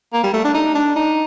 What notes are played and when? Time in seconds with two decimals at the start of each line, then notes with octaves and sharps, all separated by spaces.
0.13 A#3
0.23 G3
0.34 A3
0.44 D4
0.55 D#4
0.75 D4
0.96 D#4